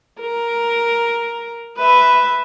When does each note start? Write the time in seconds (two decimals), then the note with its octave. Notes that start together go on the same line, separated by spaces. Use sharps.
0.21 A#4
1.78 B4 E5